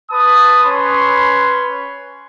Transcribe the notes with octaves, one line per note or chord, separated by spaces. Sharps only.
B4 A5 D#6
C#4 B4 C#5 B5 C6